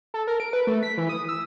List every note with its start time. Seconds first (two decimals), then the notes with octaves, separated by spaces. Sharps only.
0.14 A4
0.27 A#4
0.40 D7
0.53 B4
0.67 A3
0.83 B6
0.98 E3
1.09 D#6
1.29 E6